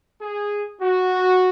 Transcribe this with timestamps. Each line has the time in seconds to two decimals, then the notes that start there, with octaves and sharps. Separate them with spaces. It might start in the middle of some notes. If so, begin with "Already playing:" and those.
0.21 G#4
0.81 F#4